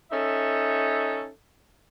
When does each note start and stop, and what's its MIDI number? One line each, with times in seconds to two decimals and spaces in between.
0.11 1.29 61
0.11 1.29 63
0.11 1.29 69
0.11 1.29 76